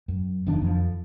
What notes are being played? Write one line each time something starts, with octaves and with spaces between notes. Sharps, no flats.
F#2
F1 E2 D#3 D4
F2 F3